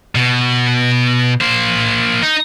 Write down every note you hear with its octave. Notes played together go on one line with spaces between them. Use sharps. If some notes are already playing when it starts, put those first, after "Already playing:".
B2
A#3 C5
D#4